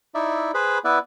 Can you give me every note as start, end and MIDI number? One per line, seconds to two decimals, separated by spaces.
0.15 0.51 63
0.15 0.51 64
0.15 0.51 74
0.15 0.51 76
0.54 0.78 68
0.54 0.78 71
0.54 0.78 72
0.54 0.78 83
0.84 0.99 59
0.84 0.99 64
0.84 0.99 71
0.84 0.99 74
0.84 0.99 76